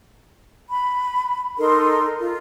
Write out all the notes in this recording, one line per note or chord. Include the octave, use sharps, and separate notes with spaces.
B5
D#4 A4 A#4 C6
F4